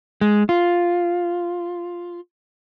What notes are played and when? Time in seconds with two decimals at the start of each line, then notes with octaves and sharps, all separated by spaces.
0.21 G#3
0.49 F4